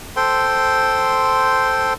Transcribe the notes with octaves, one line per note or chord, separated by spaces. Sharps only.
A4 C5 G5 C6